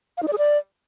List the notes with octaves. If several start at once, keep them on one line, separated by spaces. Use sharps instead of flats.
F5
D#4
D5
G#4
D5